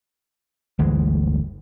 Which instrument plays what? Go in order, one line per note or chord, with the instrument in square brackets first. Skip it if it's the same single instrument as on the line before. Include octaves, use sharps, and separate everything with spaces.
[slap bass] G1 D2 E3 G#3